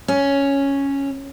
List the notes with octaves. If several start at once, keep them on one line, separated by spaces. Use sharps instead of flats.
C#4